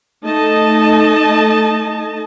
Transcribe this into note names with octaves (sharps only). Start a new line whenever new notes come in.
A3 D#4 D#5 A5